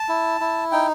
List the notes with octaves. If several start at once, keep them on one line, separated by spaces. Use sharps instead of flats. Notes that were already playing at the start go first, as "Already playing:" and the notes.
Already playing: A5
E4
E4
D#4 G5